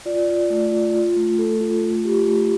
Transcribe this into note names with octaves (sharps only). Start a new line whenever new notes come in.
F4 D5
F4
A3
F4
F4
A3
A3 A4
F4
A3
F4 G4
A3